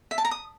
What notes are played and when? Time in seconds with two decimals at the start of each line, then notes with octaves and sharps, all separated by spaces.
0.11 E5
0.18 A5
0.25 A#5
0.31 D#6